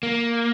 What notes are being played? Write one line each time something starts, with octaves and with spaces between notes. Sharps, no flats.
A#3